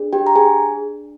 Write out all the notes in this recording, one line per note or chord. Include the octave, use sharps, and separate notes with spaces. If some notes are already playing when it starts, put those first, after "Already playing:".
Already playing: D4 G#4
G4 G5
A#5
G#4 G#5